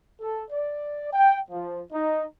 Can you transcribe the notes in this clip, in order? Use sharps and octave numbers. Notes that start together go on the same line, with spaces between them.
A4
D5
G5
F3
D#4